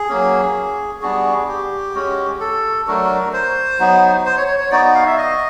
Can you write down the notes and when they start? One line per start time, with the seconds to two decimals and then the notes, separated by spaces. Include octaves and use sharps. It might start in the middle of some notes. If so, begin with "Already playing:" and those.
Already playing: G#4
0.09 F#3 A#3 C#4
1.02 G3 B3 D4 F#4 G#4
1.48 G4
1.95 G#3 C#4 F#4
2.40 A4
2.87 F#3 A3 D4 F#4 A#4
3.33 C5
3.79 F#3 B3 D#4
4.25 C5
4.37 C#5
4.48 C#5
4.59 C#5
4.71 B3 D#4 F#4 D5
4.95 F5
5.06 E5
5.18 D#5